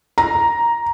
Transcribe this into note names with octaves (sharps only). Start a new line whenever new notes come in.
A#5